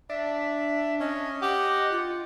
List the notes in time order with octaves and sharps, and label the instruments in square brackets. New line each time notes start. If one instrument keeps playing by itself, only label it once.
[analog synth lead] D4 [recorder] E5
[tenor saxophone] C#4 [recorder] D#5
[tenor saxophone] G4 [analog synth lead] F#5
[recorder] F4